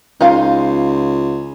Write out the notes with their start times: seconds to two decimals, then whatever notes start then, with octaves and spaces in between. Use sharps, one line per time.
0.21 C#2 D#4 F4 F5